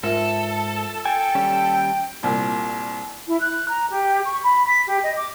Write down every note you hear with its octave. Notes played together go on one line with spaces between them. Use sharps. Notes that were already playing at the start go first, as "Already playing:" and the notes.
G#2 F4 A4 A#4 E5
G5 G#5
D#2 G3 C#4
C2 A#2
E4
F#6
A#5
G4
C#6
B5
B6
G4
D#5
D6